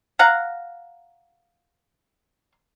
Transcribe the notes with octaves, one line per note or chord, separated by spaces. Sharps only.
F5 F#5 A#5